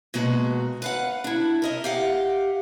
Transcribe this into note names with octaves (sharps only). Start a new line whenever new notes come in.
B2 G#3 A#3 F#4
B4 F5 F#5
D4 E4
A#4 D#5 E5
G4 F5 F#5